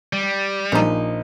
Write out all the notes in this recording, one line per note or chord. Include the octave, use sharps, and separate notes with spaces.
G3
A#1 F3 D#4